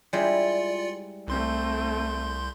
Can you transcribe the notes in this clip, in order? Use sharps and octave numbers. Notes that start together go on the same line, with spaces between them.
G3 G#3 E4 F4 D5 C#7
C2 A3 C4 C6 G6